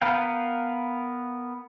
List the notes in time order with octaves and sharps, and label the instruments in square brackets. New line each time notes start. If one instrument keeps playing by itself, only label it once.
[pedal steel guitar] B3 A#4 B4 F5 G5